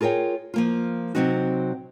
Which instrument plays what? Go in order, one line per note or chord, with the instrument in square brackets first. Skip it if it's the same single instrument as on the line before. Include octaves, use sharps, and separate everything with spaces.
[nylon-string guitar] F4 G#4 A#4 C#5 G5
F3 A#3 F4
C3 E3 F#3 C4 D#4 F#4